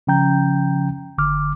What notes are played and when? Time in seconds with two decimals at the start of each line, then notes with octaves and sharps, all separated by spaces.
0.07 C#3 F3 C#4 G5 A#5 G6
1.18 G1 D3 D6 F6